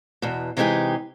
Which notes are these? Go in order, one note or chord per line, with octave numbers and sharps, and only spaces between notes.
E2 B2
C3 E3 G#3 D#4 G4 G#4